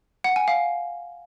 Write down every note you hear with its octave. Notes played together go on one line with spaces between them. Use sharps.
F#5
G#5
F5